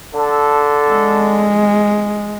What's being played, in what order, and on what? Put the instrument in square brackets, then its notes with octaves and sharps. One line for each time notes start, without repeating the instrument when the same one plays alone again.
[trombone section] D3 A4
[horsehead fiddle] G#3